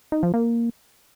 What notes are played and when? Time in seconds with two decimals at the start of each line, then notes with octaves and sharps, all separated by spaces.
0.12 D#4
0.23 F3
0.34 A#3